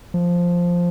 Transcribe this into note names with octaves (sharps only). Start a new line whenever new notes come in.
F3